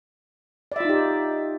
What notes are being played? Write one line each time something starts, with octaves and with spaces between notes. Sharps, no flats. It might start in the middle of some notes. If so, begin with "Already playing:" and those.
D#4 F4 G4 D5 E5